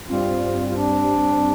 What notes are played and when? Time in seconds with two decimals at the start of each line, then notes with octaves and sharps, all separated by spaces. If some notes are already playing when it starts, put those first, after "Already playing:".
0.09 G2 G3 C4 F4
0.68 F4
0.75 D4